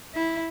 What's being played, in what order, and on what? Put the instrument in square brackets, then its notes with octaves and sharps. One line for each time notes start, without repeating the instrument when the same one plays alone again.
[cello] E4